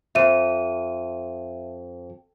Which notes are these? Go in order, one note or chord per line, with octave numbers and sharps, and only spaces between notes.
F2 E5 D#7